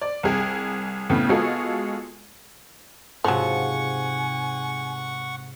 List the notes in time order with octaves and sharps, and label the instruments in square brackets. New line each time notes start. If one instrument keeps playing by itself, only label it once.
[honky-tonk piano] D5
C2 G#4 G5
A2 C#3 B3
G#3 B3 F4 F#4 G#4 A4
[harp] G#2 C3 [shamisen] F3 F#3 [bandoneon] F#5 C#6 [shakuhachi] G#5